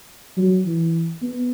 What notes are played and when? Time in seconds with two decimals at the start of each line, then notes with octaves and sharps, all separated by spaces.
0.37 F#3
0.66 E3
1.22 B3